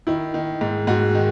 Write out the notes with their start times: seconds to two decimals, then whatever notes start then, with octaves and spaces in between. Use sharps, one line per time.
0.07 D#3 E4
0.34 D#3
0.61 G#2
0.87 G#2 F#4
1.15 D#3